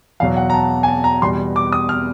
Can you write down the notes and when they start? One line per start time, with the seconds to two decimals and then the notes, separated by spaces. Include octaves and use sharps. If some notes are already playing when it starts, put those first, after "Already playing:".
0.20 E2 F5
0.23 B2 F#3
0.37 F#5
0.50 A#5
0.54 A5
0.83 G#5
0.88 A5
1.04 A#5
1.21 E2 B2 G3 C6
1.56 D6
1.72 D#6
1.89 F6